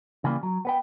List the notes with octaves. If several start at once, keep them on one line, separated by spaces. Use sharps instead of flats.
C#3 E3 G3 A#3
F#3
B3 B4 G5